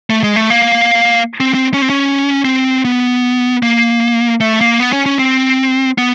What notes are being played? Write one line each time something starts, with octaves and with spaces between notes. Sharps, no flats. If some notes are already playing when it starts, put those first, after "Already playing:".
A3
G#3
A3
A#3
C4
C4
C#4
C4
C#4
C4
B3
A#3
A3
A#3
B3
C#4
C#4
C4
B3